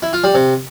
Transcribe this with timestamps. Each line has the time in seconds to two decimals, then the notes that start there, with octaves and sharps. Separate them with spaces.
0.02 E4
0.13 F4
0.24 G3
0.34 C3